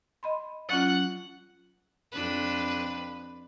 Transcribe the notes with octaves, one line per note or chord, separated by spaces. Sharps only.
D#5 B5 C6
F#3 C#4 F4 F#5
F2 D4 B4